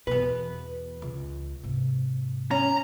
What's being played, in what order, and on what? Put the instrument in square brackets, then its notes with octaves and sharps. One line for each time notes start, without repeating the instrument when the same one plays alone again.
[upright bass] E2 B2 [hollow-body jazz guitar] B3 B4
[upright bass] C#2
G#2 C3
[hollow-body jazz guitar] C#4 [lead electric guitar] A#5